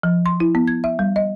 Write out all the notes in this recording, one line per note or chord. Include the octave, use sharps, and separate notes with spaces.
F3
C6
E4
B3
G#6
E5
G3
D#5